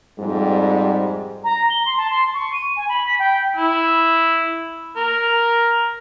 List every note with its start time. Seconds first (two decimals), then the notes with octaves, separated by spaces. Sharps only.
0.19 F2 G#2 G3
1.44 A#5
1.70 G7
1.86 C6
1.98 A5
2.11 C6
2.34 C#6
2.53 D#7
2.76 G#5
2.89 B5
3.07 B6
3.19 G5
3.57 E4
4.96 A#4